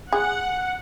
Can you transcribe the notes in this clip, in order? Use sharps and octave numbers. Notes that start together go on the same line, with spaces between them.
G#4 F#5